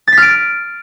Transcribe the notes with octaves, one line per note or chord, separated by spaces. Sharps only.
F6 A6 B6 D7